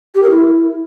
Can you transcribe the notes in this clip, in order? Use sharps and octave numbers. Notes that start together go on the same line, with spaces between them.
G4
A#4
E4